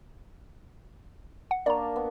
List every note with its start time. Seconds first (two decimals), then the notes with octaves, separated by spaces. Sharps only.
1.51 F#5
1.66 A#3 D4 D5 A#5 C#6
1.96 B3